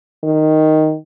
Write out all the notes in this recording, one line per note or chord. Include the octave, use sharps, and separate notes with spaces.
D#3